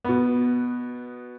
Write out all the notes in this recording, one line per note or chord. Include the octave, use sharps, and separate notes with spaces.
B2 B3